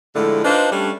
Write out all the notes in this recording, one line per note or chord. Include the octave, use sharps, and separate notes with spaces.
A2 D3 F3 G#3 A3
D4 D#4 F4 B4 C5
G3 A3 C#4 D4